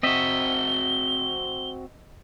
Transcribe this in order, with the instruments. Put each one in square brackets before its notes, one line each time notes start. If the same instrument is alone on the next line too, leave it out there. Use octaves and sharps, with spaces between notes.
[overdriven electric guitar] C4 F#4 [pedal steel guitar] D#5 E5 [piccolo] G7